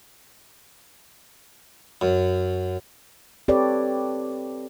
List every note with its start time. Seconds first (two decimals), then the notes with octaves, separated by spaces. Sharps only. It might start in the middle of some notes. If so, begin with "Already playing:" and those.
2.01 F#2
3.48 C4 G4 A4 B4 C#5 D5